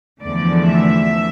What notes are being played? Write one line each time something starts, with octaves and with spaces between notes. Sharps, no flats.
E2 D3 F3 A3 D5
E5